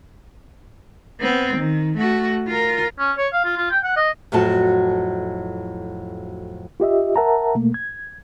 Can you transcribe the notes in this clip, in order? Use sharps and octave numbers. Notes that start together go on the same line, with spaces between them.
B3 C4
D#3
A3 F#4
F4 A#4
C#4
C#5
F5
F4
F4
G5
F#5
D#5
F2 A2 F#3 F4 F#4 A5
F4 G4 D#5 E5
A#4 E5 F#5 A5 A#5
B2 A3 A#3
G#6